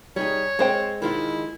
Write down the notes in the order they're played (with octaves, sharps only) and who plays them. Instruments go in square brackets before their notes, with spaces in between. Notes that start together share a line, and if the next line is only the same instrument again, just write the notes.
[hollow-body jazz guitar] G3 D#4 G#4 [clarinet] C#5
[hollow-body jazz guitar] G#3 [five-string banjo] C4 C5 G5
[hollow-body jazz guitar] D#3 G#3 F4 [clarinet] E4